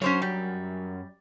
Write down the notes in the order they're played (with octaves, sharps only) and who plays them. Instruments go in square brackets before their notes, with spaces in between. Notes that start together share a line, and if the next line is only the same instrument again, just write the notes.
[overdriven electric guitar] F#2 [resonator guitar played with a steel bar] C#4 C5 C#5
[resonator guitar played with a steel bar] G3